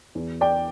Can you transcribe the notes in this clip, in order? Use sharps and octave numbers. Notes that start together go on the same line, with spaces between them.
E2
D5 G5